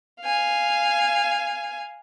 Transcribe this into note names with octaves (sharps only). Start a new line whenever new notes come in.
F5 G#5